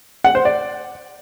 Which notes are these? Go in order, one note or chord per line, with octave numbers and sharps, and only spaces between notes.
F#5
C5
D5